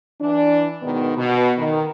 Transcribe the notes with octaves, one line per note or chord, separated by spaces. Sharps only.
E3 D4
G#2 B2 D#3 B3
B2
D#3